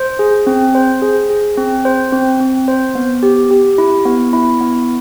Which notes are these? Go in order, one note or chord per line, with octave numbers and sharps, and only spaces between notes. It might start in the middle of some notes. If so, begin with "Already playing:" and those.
Already playing: C5
G#4
C4
C5
G#4
G#4
C4
C5
C4
C4
C5
B3
G4
G4
E4
B3
E4
B3